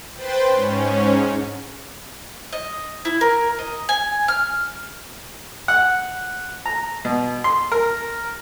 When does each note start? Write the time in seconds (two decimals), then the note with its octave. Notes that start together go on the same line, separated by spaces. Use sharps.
0.14 B4 C5 G5 C6 A6
0.48 G#2 C#4
2.53 D#5
3.05 E4
3.21 A#4
3.59 D#5
3.89 G#5
4.28 F6
5.68 F#5
6.66 A#5
7.05 B2
7.44 C6
7.72 A#4